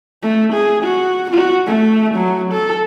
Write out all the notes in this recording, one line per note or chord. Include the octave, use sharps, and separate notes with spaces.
A3
G#4
F#4
F#4
A3
F#3
A4